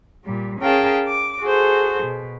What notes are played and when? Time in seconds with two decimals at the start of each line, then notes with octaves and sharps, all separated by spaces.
0.24 A#2 G3
0.60 C#4 G#4 A#4 F5 G5 A5
1.07 D6
1.41 F#4 G#4 A4 C5
2.04 B2